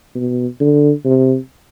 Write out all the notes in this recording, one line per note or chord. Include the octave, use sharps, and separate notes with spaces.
B2
D3
C3